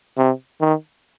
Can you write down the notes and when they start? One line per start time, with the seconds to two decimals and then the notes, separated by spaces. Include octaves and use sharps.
0.18 C3
0.60 D#3